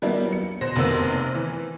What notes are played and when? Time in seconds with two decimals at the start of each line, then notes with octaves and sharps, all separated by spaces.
0.02 F#3 G3 A#3 B3 D4 E4
0.32 C#7
0.61 B2 C5 A#6
0.76 F1 C3 A#3 B3 C5 E6
1.35 E3